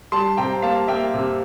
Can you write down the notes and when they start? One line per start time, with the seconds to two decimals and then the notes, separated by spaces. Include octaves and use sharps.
0.12 G3 A5 C6
0.37 C3 G5 A#5
0.62 A#3 F5 A5
0.88 A#3 E5 G5
1.14 C3